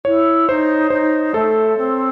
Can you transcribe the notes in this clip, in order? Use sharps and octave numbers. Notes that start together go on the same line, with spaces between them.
E4 C#5
D#4 C5
D#4 C5
A3 A4
C4